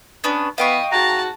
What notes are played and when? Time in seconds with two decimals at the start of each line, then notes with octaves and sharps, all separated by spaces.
0.24 B3 C#4 D4
0.58 E3 B3 D#5 F5 G5 C#6
0.92 G#2 F#4 A5 A#5